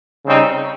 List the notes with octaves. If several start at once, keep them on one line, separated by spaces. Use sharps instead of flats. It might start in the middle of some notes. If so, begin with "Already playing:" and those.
C#3 G3 C4 D#4